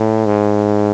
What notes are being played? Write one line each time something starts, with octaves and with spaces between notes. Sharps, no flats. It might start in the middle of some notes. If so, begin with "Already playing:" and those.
Already playing: A2
G#2